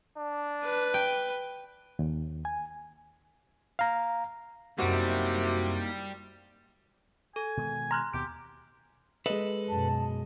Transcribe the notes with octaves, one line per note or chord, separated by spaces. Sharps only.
D4
B4
G5
D#2
G#5
F5 A#5
F#2 C3 G3 A#3 D#4 E4 F#4
A4 G#5
B2 D#3 G#3
A#5 C6 F6 F#6
D#2 B2 G4 D7
G#3 A4 B4 D#5
F#2 B2 A5